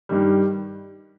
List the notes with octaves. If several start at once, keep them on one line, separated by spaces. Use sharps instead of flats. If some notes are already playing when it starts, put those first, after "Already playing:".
G2 D#3 G3